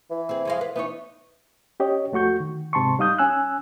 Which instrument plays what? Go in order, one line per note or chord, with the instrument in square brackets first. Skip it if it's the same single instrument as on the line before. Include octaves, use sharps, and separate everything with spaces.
[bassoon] E3
[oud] C4 G#4
F2 G#3 F5
B4
[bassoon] E3 [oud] B3 D#4 C#5
[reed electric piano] C#4 G4 C#5 D#5
F2 A3 F#4 C#6 G6
D#3
G#2 C3 A5 C6 C#6
G3 D#4 F5 D#6 G6
C#4 G#5 E6 F#6